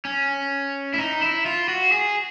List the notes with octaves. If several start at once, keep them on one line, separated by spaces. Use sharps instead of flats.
C#4
E4
D#4
E4
F4
F#4
G#4